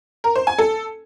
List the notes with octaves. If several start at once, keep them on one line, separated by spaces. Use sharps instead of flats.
A#4
C5
G#5
A4